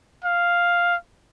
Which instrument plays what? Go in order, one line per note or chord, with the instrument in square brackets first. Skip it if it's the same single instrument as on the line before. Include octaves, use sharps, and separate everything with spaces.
[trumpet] F5